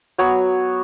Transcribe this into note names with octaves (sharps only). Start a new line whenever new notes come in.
F#3 B3 C#5